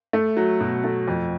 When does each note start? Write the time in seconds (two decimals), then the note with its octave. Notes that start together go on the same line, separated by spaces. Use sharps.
0.13 A3
0.37 F#3
0.60 B2
0.84 A3
1.08 F2